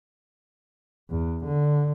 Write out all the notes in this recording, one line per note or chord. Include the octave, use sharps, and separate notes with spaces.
E2
D3